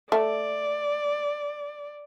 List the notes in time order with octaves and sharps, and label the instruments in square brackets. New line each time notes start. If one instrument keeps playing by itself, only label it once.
[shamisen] A3 [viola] D5